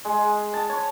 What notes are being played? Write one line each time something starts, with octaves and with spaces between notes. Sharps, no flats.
G#3
A5
C#5